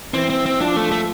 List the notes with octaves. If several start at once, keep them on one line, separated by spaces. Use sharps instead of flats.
E3 C4
C4
C4
F3 D4
A3
A3